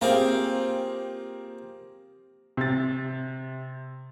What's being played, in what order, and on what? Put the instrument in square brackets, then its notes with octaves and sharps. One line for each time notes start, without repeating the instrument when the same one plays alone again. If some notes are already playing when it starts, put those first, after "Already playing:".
[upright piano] A#3 C4 [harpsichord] F4 G4 G#4
[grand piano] C3 A6